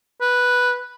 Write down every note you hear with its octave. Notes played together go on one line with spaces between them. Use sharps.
B4